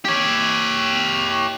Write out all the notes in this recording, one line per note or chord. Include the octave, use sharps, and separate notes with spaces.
G4 C#5